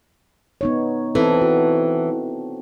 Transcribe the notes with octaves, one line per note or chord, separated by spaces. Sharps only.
B3 D#4 C#5
E3 C4 A4
F#4